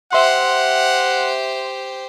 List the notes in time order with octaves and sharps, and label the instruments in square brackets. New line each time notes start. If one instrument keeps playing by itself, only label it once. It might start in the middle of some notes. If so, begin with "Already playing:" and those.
[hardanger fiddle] G4 C5 [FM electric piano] E5 C6 [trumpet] F#5